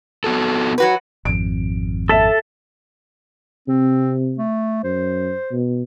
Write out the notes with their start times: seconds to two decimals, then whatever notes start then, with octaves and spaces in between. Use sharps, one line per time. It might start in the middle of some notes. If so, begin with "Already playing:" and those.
0.24 B3 F#4 A4
0.78 F#3 F#4 B4
1.25 G#1 F2 D7
2.09 A4 E5 A5 B6
3.68 C3 C4
4.38 A3
4.84 F#2 C5
5.52 B2